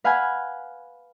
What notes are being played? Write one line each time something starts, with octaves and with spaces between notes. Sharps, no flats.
B4 F5 F#5 G#5 B5 G#6